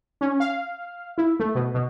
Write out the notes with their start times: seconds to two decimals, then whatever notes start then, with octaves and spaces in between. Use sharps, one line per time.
0.21 C#4
0.40 F5
1.18 E4
1.40 A3
1.55 B2
1.74 B2